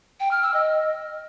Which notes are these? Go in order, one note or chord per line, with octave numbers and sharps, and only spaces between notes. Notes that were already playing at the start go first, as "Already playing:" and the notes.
G5
F6
E6
D#5